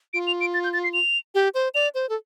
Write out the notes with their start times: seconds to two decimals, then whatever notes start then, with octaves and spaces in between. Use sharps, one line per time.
0.13 F4 D7
0.27 F7
0.41 D7
0.54 A6
0.64 G6
0.73 A6
0.83 C7
0.93 F7
1.35 G4
1.54 C5
1.74 D5 F7
1.95 C5
2.09 A4